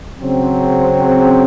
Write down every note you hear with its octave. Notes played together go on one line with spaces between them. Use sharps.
C#3 F#3 C4